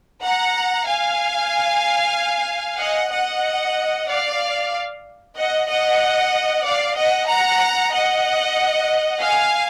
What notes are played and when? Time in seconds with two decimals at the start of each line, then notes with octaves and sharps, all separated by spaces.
0.22 F#5 A#5
0.86 F5 G#5
2.79 D#5 F#5
3.11 D#5 F#5
4.08 D5 F5
5.36 D#5 F#5
5.68 D#5 F#5
6.64 D5 F5
6.96 D#5 F#5
7.28 F#5 A#5
7.92 D#5 F#5
9.21 F5 G#5